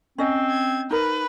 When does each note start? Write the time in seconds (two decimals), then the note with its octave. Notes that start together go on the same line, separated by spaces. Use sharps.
0.18 C4 C#4 D#5
0.50 G#6
0.91 D#4 A#4 B4